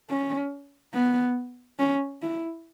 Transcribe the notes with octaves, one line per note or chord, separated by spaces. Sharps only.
C#4
B3
C#4
E4